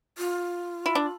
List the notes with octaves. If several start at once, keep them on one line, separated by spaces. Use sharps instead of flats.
F4
E4
D4